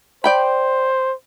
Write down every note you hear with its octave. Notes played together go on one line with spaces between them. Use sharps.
C5 D5 G5 B5